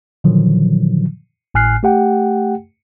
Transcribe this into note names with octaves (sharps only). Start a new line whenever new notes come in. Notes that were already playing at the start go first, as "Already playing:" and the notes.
A#2 D3 D#3 F3 F#3
G#1 A2 G#5 F6 F#6 C7
A3 G4 F#5 G5